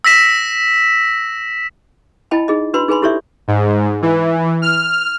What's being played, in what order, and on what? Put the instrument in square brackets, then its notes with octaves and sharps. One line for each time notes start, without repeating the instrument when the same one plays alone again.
[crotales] E6 A#6 B6 E7
[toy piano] E4 D#5 G5 A5 B5
D#4 G#4 D#5
D4 F#4 B4 B5 C6
D#4 G#4 B4 G#5 B5 C6
E4 G4 A4 C#5 D5 E5
[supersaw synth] G#2
E3
F6